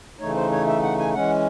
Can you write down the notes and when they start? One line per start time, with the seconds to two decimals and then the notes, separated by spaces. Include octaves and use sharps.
0.19 C#3 E3 A3 D#4 C#5
0.35 C5
0.51 C#5
0.67 E5
0.83 F#5
0.99 G#5
1.14 E3 G#3 C#4 F#5